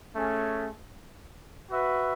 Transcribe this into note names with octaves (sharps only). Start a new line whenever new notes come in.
A3 C#4 G#4
F#4 B4 E5